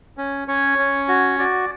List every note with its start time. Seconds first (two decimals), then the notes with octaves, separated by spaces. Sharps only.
0.18 C#4
0.48 C#4 C#5
0.78 C#4
1.08 F#4
1.39 F#4 D5